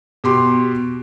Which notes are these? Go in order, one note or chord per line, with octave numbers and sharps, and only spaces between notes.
B2 G4 C6